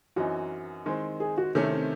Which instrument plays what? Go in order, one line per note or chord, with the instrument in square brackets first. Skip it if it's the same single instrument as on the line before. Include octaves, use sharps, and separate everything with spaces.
[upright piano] F#2 E3 C4 D#4 [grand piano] F#4
[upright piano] D#3 G#3 C4
[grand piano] G#4
F#4
[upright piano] C3 D#3 A3 C#4
[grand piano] C4